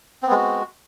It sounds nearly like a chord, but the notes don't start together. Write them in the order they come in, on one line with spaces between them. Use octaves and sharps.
C4 B3 G#3 F#4